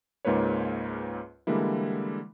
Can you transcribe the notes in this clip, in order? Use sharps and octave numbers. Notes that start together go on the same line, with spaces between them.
C#2 G#2 A#3 F4 B4 C#5
D3 E3 G3 G#3 A#3 E4